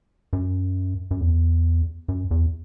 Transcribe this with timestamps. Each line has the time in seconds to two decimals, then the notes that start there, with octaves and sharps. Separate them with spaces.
0.33 F#2
1.11 F#2
1.21 E2
2.08 F#2
2.31 E2